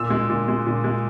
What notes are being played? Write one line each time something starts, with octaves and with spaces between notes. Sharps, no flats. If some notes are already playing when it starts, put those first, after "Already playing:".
Already playing: A#2 E6
G#3
A#2
G#3
A#2
G#3